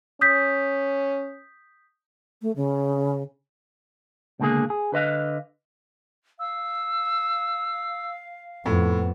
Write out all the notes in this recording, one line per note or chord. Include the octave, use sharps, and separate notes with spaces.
C#4 D#6 G6 B6
A3
C#3
C#2 B2 D3 A3 A#3 G#4
G#4
D3 B4 D#5 F5
F5 E6
F2 A2 B3